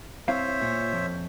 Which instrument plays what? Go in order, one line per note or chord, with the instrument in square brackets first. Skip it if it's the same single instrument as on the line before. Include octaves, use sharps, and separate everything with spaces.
[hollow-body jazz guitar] C4 E4 F5 [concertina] C5 C#5 E5
[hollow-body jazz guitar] A#2
F2